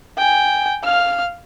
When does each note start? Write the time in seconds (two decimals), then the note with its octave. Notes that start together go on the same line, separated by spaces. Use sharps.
0.18 G5 G#5
0.84 F5 F6